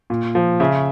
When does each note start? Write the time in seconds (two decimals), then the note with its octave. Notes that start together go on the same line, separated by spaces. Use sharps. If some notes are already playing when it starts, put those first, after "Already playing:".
0.10 A#2
0.35 F3
0.60 C#3 E5